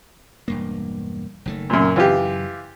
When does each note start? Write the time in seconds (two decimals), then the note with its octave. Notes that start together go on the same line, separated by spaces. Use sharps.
0.48 E1 G2 A#3
1.46 F#1 D#3 A3
1.70 F#2 A#2
1.96 F#2 C#3 E3 F4 G4